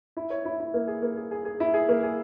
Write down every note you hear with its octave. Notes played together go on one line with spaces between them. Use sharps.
E4
C#5
E4
E4
A#3
G#4
A#3
G#4
G#4
G#4
E4
G#4
A#3
G#4